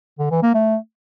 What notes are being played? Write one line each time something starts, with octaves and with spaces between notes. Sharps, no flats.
D3
E3
A#3
A3